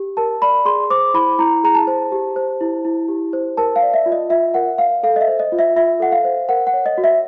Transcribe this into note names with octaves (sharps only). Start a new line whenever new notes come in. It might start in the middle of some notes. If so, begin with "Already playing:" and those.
Already playing: G4
A#4 A5
D5 B5
G#4 C6
C5 D6
E4 B5
E4 A#5
G#4 A#5
A5
C5
G4
C5
E4
E4
G4
C5
A#4 A5
F5
D5
E5
F4
D#5
F4 E5
A#4 F#5
D5 F5
A4 F5
D#5
E5
C5
D#5
F4
E5
F4 E5
A4 F#5
F5
C5
A#4 F#5
F#5
C#5
D#5
F#4
E5